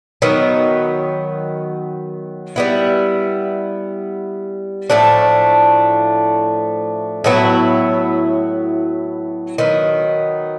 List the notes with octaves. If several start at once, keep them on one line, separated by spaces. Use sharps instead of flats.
D#3 F#3 B3
G3 B3 E4
A2 F3 A3 D4
A2 F#3 B3 E4
D#3 F#3 B3